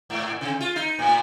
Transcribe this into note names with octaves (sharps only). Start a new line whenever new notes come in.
G#2
C3
F4
D#4
A2